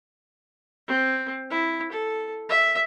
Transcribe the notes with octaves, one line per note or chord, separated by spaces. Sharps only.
C4
E4
A4
E5